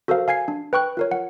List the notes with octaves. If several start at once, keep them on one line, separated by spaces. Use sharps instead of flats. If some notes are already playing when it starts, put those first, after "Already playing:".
F#4 A4 A#4 C5 F5
F5 G#5 G#6 C7
D4
B4 G5 C#6 F#6
F4 A#4 C#5
F#5